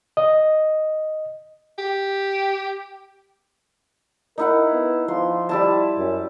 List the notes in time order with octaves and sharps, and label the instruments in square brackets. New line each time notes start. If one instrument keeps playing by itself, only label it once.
[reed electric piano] D#5
[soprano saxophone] G4
[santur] D#4 E4 F#5 [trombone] A#4
[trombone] B3
[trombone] F3 [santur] C6
[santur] G3 E4 A5
[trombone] F#2